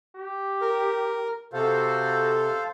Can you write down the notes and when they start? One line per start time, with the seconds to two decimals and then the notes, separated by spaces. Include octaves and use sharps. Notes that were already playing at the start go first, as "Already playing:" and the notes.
0.16 G4
0.61 A#4
1.53 C3 F#4 A4 C5 F5